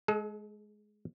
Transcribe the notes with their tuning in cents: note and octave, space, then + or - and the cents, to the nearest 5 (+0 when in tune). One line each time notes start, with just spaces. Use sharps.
G#3 +15 A4 -40